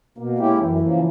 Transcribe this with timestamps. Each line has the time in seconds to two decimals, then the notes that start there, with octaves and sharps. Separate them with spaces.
0.17 B2 A#3
0.38 G#3 C#4 E4 G4
0.59 F#2 E3
0.79 C#3 F3 A#3